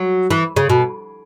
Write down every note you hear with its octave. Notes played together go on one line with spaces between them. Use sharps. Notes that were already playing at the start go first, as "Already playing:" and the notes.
Already playing: F#3
E3
C#3
B2